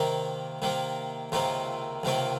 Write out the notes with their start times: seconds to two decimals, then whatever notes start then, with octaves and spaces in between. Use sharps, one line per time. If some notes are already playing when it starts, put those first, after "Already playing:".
Already playing: C3 D#3 A#3
0.62 C3 D#3 A#3
1.32 C#2 C3 D#3 A#3 F4
2.03 C#2 C3 D#3 A#3 F4